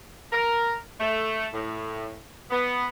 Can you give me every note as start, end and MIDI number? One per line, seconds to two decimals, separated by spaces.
0.32 0.75 70
1.00 1.46 57
1.54 2.14 45
2.51 2.85 59